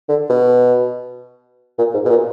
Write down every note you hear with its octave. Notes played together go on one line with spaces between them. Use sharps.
D3
B2
A#2
G#2
B2
A#2